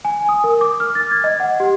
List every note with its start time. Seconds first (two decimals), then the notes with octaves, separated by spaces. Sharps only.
0.05 G#5
0.29 D#6
0.44 A#4
0.61 D6
0.80 F6
0.95 A6
1.11 G#6
1.24 D#5
1.40 F#5
1.60 G4